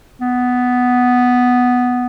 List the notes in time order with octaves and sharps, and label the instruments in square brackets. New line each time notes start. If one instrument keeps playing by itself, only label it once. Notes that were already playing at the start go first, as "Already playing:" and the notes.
[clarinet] B3